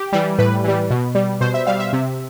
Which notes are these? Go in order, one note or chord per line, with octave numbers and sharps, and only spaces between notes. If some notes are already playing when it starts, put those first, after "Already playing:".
Already playing: G4
E3 G3
A2 B4
E3 G3
B2
G3
B2 C5
E5
G3 F5
E5
C3